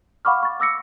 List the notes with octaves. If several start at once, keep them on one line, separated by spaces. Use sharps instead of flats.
F5 F#5 B5 C#6 D6 F6
C#6 A6
D6 E6 A#6 C#7